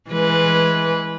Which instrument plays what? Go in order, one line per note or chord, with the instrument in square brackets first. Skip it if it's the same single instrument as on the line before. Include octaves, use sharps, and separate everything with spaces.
[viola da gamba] E3 G#3 B4